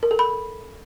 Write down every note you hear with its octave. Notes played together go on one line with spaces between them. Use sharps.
A#4
A4
B5